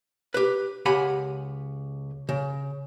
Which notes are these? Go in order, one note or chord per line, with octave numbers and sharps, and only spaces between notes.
G4 B4
C#2 G4 F#5 G#5 B5
C#3